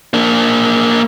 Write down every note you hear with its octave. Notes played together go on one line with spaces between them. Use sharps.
A#3 D4